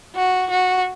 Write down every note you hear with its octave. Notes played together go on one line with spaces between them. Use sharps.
F#4
F#4